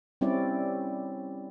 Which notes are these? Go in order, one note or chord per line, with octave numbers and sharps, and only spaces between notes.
G3 C4 C#4 E4 D5